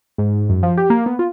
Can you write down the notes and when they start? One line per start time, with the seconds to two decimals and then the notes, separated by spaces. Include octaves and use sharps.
0.18 G#2
0.49 F#2
0.63 F3
0.77 G4
0.90 A#3
1.06 B3
1.19 F4